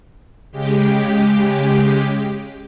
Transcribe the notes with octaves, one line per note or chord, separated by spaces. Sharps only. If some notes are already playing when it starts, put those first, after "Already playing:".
C#3 G#3 G4